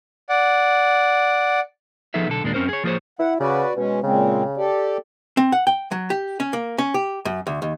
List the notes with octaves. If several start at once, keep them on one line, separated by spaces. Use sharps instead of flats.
D5 F#5
F3 B3 D#4 G#4 A4 E5
B1 D3 A4
D#2 A#2 G#3 A#3 D4
F#2 C4 C#4 A#4 C5
G#4 C#5
F3 A#3 G#4 A4 C5 C#5
E4 F#5
C#3 F#4 B4 D5
B2 G#3 C#4
A#2 C#3 G#3 C4
G4 A4 D5
C4
F#5
G5
F#3
G4
C#4
A#3
C#4
G4
F#2
D2
D#2